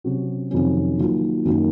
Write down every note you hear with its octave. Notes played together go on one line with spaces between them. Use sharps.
C3 F#3 C#4 F#4
F2 C3 D#3 F#3 C#4
D#3 F#3 A#3 F4
F#2 D#3 F#3 A#3